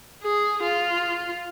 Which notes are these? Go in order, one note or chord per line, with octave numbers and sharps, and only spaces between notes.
G#4
F4